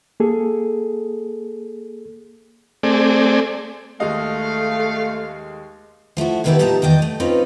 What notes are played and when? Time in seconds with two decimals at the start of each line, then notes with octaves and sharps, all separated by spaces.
0.20 A#3 G#4 A4
2.83 A3 C4 G#4 D5
4.00 D#2 G#3 A3 D#5 F5
6.17 F3 A3 E4 F#4
6.44 A2 D#3 E3 B3 E4 G4
6.59 A#2 G3 A3 D#4 A5 A#5
6.82 E2 D#3 D5 D#5 G5
7.02 A3
7.20 C4 C#4 D#4 F4 B4